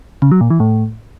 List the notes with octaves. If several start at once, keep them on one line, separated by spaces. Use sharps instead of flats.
C#3
F#3
A#2
E3
A2